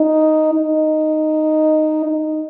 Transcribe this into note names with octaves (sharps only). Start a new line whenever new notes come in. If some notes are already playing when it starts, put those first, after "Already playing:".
Already playing: D#4
D#4
D#4